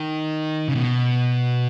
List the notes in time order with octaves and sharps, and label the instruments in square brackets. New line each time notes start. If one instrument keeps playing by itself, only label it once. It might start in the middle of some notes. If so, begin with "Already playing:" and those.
Already playing: [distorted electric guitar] D#3
C#3
B2